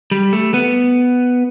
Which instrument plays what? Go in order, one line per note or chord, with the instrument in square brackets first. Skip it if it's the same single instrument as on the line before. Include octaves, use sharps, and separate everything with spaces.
[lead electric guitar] G3
A3
B3